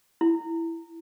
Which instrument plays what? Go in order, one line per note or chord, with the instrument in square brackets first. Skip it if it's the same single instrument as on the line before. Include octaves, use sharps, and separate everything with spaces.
[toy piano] E4